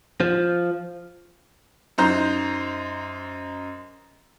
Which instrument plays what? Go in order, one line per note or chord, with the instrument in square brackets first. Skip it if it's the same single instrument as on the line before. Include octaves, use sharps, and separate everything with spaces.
[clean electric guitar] F3
[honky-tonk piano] F#2 D#4 C5 A#5 G6